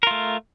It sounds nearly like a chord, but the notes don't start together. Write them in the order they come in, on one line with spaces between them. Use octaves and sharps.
A#4 F4 A3